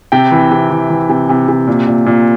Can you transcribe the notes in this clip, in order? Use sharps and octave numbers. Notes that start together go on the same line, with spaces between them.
C3 G5
E3
C3
E3
E3
C3
C3
C3
A#2
A#2
A#2